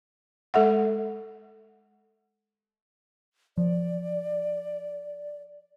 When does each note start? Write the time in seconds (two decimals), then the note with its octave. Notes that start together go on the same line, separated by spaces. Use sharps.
0.54 G#3 A4 E5 F#5
3.58 F3 D5